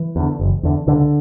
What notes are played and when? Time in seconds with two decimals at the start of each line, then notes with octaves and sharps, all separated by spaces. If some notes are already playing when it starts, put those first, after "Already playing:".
Already playing: E3
0.16 E2 D3
0.40 F#1
0.63 E2 D3
0.87 C#2 D3